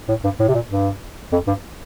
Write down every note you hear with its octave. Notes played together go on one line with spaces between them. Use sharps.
A2
G2
A2
C3
A#2
G2
F2
G2